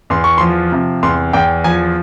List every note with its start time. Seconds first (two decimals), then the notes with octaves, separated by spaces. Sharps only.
0.10 E2 C6
0.24 C#6
0.38 C6
0.41 F3
0.72 C3
1.03 E2 C6
1.33 E2 G5
1.64 F3 G#5